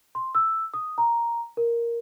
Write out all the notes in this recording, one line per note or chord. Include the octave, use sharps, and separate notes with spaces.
C6
E6
D#6
A#5
A#4